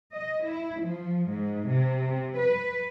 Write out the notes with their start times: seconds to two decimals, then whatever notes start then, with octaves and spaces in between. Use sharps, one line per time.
0.13 D#5
0.43 E4
0.81 F3
1.30 G#2
1.68 C3
2.37 B4